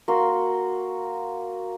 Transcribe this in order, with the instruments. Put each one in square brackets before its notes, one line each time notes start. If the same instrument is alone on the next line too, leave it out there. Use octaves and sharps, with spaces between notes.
[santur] A#3 F#4 C6